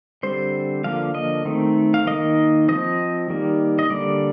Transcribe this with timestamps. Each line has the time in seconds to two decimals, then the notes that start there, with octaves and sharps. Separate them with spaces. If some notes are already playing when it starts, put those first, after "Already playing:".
0.23 D3 G3 C4 C5
0.84 D3 F3 A#3 F5
1.15 D#5
1.45 D#3 A3 C4
1.94 F5
2.07 D#3 A#3 D#5
2.68 F3 C4 D#5
3.30 D#3 G3 A#3
3.79 D#5
3.90 D3 G3 A#3 D5